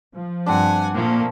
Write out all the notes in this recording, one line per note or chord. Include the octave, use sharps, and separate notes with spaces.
F3
G2 C4 D4 F#5 G#5
A#2 F3 A3 A#3